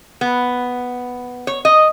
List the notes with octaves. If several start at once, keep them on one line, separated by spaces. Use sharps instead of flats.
B3
C#5
D#5